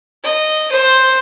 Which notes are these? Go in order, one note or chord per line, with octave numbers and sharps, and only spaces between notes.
D#5
C5